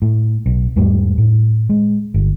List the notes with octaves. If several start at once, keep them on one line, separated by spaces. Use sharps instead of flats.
A2
B1
E2 G#2 G3 A3
A2
G#3
G1